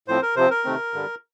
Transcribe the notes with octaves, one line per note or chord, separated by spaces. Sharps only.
A2 F3 C4 C5
A#4
C3 F3 C4 C5
A#4
C3 D#3 A3 C4
G2 D3 G3